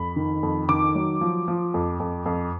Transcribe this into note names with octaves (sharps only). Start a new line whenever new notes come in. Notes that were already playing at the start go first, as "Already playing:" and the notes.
Already playing: F2 B5
D#3
F2
D#3 D6
F#3
F3
F3
F2
F2
F2